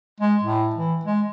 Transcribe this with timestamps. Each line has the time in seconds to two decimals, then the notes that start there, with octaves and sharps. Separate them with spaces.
0.20 G#3
0.43 A2
0.75 E3
1.05 G#3